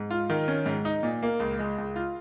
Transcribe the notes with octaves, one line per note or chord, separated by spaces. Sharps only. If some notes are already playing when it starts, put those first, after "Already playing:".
Already playing: G#2
F4
D#3
C#4
G#2
D#4
A#2
A#3
C#2
G#3
C#2
F4